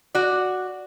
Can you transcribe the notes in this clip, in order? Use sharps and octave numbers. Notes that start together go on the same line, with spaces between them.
F#4 D5